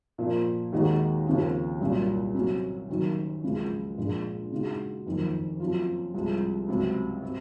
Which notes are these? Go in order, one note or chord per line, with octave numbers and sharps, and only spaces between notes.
A#2 F3 A#3
D#2 D#3 G#3 D#4 F#4
D#2 C#3 F3 C4
C2 A#2 F#3 C#4
C3 F#3 C#4
F#1 F#2 D#3
C#2 C#3 F3 G#3
A#1 A#2 G#3
C#3 G#3 D#4 F#4
F#1 F2 D#3
F#2 F3 C4 F4
C2 C3 F3 G#3
C#2 C3 F#3
C3